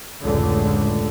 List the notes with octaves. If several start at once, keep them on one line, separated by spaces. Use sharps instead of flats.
F1 C#2 A2 D3